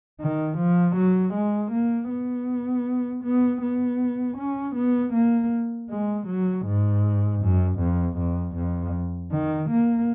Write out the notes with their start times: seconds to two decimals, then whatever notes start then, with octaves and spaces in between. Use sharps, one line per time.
0.20 D#3
0.58 F3
0.96 F#3
1.34 G#3
1.72 A#3
2.10 B3
3.24 B3
3.62 B3
4.38 C#4
4.76 B3
5.14 A#3
5.90 G#3
6.28 F#3
6.66 G#2
7.41 F#2
7.80 F2
8.18 F2
8.56 F2
9.32 D#3
9.70 A#3